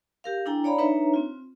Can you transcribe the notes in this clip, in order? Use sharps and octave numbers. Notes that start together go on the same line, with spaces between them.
G4 A#4 F5
D4 E4 A4 G5 G#5 A#5
C#5 D5 F5 A#5 B5
D4 D#4 B4 C#5 E5 A#5
C4 F4